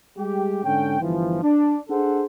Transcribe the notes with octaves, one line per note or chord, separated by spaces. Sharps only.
G3 G#3 G4
G#2 D3 C#4 G5
G1 E3 F3
D4
D4 G#4 A4 C5 F#5